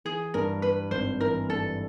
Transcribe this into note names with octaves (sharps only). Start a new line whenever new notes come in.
E3 G#4
G2 A#4
G3 B4
G#1 C5
E3 A#4
G2 A4